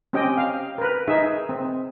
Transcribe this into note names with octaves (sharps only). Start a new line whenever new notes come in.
C4 C#4 G4 D#5 G5
F5
A#4 B4
D#4 G#4 E5
C4